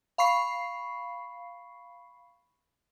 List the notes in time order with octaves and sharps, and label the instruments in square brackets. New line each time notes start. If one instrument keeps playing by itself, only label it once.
[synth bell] F5 B5 C#6 C7